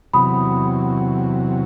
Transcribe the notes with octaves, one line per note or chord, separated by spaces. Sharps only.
E2 C3 F#3 B5 D#6